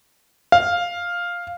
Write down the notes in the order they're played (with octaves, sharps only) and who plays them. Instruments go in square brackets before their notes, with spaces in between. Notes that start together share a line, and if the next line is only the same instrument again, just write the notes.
[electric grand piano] F5